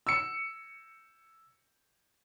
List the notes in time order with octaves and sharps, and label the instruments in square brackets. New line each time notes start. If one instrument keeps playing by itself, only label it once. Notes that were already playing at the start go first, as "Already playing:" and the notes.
[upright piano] E6 C#7